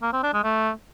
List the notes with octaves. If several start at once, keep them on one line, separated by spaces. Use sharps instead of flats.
A#3
C4
D4
G#3
A3